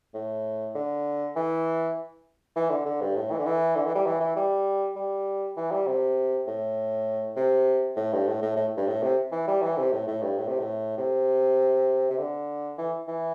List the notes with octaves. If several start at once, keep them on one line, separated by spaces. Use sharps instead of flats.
A2
D3
E3
E3
D3
D3
G2
A2
E3
D3
E3
D3
E3
G3
E3
E3
G3
G3
E3
G3
C3
A2
C3
A2
G2
A2
A2
A2
G2
A2
C3
E3
G3
E3
C3
A2
A2
G2
A2
C3
A2
C3
C3
D3
E3
E3